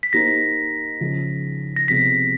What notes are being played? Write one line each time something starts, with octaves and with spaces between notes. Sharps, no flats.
B6
A#3 D#4 G4 C5 A#6
C#3 F3 G#3
A#6
C3 F3 G#3 B3 B6